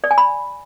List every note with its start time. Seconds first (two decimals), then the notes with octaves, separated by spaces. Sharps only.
0.04 D5
0.11 G#5
0.18 B5